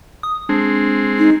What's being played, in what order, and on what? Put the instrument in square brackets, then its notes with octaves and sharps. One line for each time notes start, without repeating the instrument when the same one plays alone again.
[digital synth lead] D#6
[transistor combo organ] G#3 C4 [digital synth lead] D4
[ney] D#4